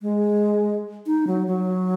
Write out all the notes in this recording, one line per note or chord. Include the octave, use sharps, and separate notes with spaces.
G#3
D#4
F#3
F#3